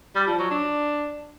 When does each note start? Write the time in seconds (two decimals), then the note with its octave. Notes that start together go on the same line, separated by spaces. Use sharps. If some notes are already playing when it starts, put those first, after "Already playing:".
0.15 G3
0.27 F3
0.39 F#3
0.51 D4